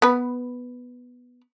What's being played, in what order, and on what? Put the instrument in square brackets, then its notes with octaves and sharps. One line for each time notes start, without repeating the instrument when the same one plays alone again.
[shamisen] B3 B4